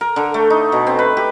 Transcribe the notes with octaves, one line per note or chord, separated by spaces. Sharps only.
A#4
D3
A3
D#4
B2
C4
B4
G4